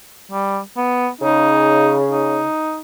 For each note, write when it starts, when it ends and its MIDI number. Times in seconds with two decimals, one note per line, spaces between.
0.32 0.60 55
0.77 1.09 59
1.21 2.43 49
1.21 1.97 63
2.11 2.80 63